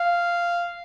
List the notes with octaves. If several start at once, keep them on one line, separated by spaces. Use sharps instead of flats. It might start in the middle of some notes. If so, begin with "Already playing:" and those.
Already playing: F5